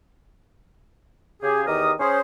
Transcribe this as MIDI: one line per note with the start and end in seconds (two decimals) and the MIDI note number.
1.42 1.64 49
1.42 1.64 67
1.42 1.64 68
1.66 1.92 40
1.66 1.92 51
1.66 1.92 67
1.66 1.92 70
1.66 1.92 87
2.00 2.20 61
2.00 2.20 68
2.00 2.20 72